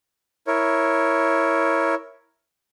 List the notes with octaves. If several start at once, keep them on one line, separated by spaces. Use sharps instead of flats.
E4 A#4 C#5